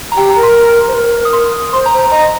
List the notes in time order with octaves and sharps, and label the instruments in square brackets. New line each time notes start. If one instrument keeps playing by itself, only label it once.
[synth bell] A#5
[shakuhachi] G4 [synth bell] G5
[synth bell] A#5
[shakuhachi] A#4
[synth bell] C6
[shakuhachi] C5
A#4
[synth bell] D#6
C6
[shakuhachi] C5 [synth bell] C6
[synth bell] A#5
[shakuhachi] C5
[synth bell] A#5
[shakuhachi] D#5 [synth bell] A#5